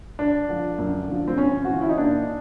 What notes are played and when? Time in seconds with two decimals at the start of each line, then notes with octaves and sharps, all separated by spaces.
0.19 G2 D4
0.49 D3 F3
0.78 F#2
1.08 D3 F3
1.28 C4
1.38 G2 C#4
1.65 E3 F#4
1.73 F4
1.81 E4
1.89 D#4
1.97 A#2 D4